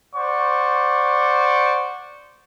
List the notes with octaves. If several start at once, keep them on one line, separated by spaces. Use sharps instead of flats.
C5 D5 F#5 C#6